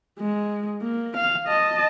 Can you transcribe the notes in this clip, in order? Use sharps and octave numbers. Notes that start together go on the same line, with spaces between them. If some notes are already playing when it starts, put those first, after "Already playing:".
G#3
A#3
F5
D#5 A5